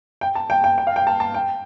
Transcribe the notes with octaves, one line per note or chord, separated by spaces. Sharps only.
G5
A5
G5
G5
G5
F5
G5
A5
A5
G5